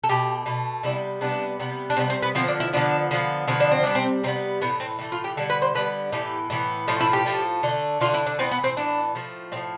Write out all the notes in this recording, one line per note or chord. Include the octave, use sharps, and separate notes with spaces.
A4
B2 A3 G4
B2 A3
C3 G3 B3 E4
C3 G3 B3 D4
C3 G3 B3
D4
C3 G3 B3 C4
C4
B3
D3 F3 B3 C4
D4
E4
D3 F3 B3 D4
D3 F3 B3
D3 F3 B3 C4
D4
C4
C3 G3 B3 D4
C4
C3 G3 B3 C4
A2 E3 A3 B3
C4
A2 E3 A3
F4
G4
D3 G3 B3 A4
B4
C5
D3 G3 B3 B4
A2 E3 B3 G4
A2 E3 B3
A2 F3 A3 F4
E4
G4
A2 F3 A3
D3 A3
D3 A3 F4
E4
D4
A2 E3 B3 C4
B3
C4
A2 E3 B3 D4
A2 F3 A3
A2 F3 A3 C4